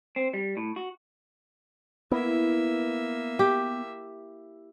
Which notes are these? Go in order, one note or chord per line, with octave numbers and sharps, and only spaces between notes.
C4
G3
A2
F#4
A#3 B3 E4 E5
G4